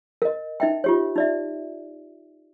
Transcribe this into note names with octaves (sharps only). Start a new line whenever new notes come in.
A#4 D#5
D#4 E5 G5
F4 G4 C#5
D#4 D5 E5